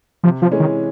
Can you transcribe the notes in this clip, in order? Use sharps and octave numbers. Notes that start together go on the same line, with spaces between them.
C3 F3
F3
E3 G#3 C#4
D#3